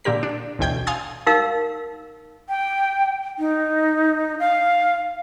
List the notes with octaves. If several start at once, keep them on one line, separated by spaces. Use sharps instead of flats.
A#2 D3 G4 A#4 B6
D4
A1 D2 B2 G5 G6 G#6
F5 G#5 C6 D#6 G#6 A6
D#4 A#4 F5 E6
G5
D#4
F5